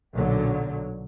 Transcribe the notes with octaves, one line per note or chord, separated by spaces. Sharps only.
B1 A#2 D3 F#3